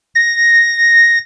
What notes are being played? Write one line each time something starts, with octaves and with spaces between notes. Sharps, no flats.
A#6